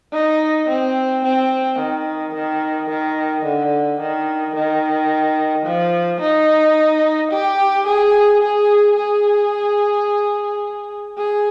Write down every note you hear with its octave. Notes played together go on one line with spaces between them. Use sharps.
D#4
C4
C4
D#3
D#3
D#3
D3
D#3
D#3
F3
D#4
G4
G#4
G#4
G#4
G#4